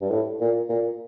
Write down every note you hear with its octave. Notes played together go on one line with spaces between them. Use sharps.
G2
A2
A#2
A#2